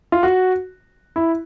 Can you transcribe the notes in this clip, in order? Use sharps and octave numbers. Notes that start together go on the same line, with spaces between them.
F4
F#4
E4